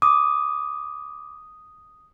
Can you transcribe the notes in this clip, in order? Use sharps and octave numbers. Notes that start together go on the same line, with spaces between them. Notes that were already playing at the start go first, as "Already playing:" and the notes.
D6 D#6